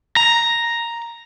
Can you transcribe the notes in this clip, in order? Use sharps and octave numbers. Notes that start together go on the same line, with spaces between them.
A#5